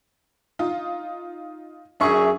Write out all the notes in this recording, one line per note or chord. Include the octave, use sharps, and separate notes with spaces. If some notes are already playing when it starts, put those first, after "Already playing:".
D#4 F4
F#2 D4 G#4 E5 C#6